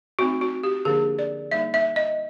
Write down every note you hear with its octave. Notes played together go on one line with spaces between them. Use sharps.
A3 C4 D#4 F#4
F#4
G4
D3 F3 A#3 D4 G#4
D5
G3 A#3 D#4 E5
E5
D#5